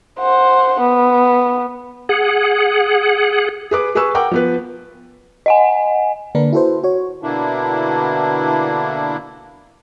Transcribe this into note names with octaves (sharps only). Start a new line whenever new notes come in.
C5 F#5
B3
G#4 F#5
G#4 B4 D6
G#4 B4 G#5 C#6 E6
A#4 F#5 G5 D6
F3 B3 B4
D#5 F#5 G#5
D3 A#3 D4 A#4 B4
E4 F#4 A4 B4 C5
F#4 C#5
B2 D3 A#3 D4 E4